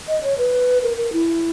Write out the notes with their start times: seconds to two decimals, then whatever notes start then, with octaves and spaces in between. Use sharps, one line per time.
0.08 D#5
0.23 C#5
0.38 B4
0.83 A#4
0.97 A#4
1.13 E4